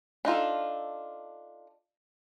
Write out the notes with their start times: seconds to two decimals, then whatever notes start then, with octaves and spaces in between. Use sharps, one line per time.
0.25 D4 D#4 F4 A4